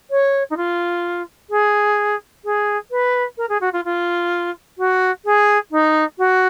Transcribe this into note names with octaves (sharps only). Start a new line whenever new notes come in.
C#5
D#4
F4
G#4
G#4
B4
A#4
G#4
F#4
F4
F4
F#4
G#4
D#4
F#4